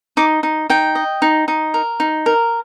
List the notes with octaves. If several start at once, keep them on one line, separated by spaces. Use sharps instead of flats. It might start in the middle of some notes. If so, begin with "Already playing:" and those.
D#4 D6
D#4
D#4 G5
D#5
D#4
D#4
A#4
D#4
A#4